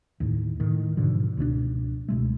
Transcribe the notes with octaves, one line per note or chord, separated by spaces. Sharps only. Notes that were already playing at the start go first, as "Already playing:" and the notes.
D#2 A2
A2 D#3
G#2 B2 D3 F3
C#2 B2 F#3 D4
C#2 B2 G#3 A3